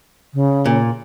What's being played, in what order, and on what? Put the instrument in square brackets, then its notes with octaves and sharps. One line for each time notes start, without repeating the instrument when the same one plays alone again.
[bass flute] C#3
[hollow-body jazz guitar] A#2